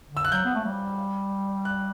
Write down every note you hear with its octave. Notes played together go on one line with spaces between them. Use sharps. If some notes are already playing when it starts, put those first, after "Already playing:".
D3
E6
F#6
F#3 G6
B3
A3
G3
F#6